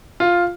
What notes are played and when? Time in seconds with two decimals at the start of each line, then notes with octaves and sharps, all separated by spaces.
0.20 F4